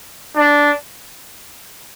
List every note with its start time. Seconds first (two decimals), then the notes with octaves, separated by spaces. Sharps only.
0.36 D4